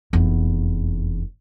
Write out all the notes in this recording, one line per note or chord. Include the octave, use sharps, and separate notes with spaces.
F1 E2